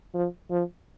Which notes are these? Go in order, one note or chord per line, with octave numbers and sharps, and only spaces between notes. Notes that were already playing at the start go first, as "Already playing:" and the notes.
F3
F3